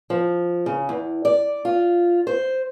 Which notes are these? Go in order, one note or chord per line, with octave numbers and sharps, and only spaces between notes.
F3
C#3
E2
D5
F4
C5